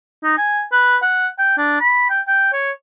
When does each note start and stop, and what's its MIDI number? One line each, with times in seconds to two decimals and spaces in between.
0.23 0.36 63
0.38 0.64 80
0.72 0.97 71
1.02 1.28 78
1.39 1.56 79
1.57 1.80 62
1.80 2.06 83
2.10 2.20 79
2.27 2.50 79
2.53 2.71 73